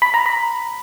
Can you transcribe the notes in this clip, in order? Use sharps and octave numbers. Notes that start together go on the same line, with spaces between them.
B5
A#5
B5